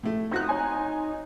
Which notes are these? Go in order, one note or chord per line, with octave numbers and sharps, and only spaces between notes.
A2 A3
C4 D#4 F#4 F#6
C#5 G#5 C6